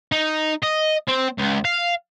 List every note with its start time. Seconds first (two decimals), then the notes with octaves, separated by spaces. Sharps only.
0.12 D#4
0.63 D#5
1.08 C4
1.38 C#2
1.65 F5